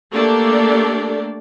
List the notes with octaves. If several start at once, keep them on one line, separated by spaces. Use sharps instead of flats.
A3 A#3 D4 G4 A4 D5